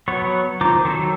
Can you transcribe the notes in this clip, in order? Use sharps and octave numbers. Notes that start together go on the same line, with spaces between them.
F#3 B3 C#5
D#3 F4 C5 A#5 D6
D#3 F#3 A4